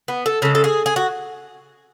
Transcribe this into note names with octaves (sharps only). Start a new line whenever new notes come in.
B3
A4
C#3 G#3 A4
A4
G#4
G#4
F#4